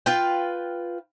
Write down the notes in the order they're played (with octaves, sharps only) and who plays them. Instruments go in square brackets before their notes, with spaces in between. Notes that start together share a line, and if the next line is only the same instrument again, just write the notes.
[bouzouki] F4 B4 G5